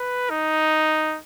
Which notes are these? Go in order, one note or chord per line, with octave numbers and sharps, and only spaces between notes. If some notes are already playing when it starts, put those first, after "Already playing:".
Already playing: B4
D#4